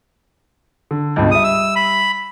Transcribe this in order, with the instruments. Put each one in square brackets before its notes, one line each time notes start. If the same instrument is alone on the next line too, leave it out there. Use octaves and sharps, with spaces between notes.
[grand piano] D3
C#2 G2 B2
[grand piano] G3 E5 [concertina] D#6
[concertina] E6
B5